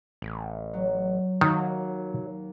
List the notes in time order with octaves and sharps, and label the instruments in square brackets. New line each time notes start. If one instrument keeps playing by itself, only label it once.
[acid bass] A1
[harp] F#3
[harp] D#2 [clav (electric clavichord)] D#3 [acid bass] F#3